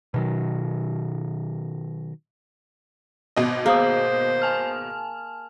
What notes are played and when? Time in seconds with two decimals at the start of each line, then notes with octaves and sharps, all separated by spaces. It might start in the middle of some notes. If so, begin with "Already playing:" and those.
0.14 B2 D#3 F#3
3.36 G#1 B2 D#5
3.66 A#3 G#4 C5 A#5 D#6
4.42 G#5 A5 F6